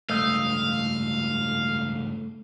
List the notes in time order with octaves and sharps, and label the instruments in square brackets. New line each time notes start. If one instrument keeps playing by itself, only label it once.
[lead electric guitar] C#2 G2 [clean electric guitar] A3 D#5 [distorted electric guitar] F5